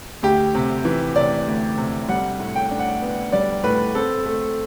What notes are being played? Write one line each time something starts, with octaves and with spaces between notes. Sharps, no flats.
D2 G4
C3
E3
C3 D5
D2
C3
G3 F#5
A2
G5
D4
F#5
B3
G3 D5
A2 B4
C4 A4
A3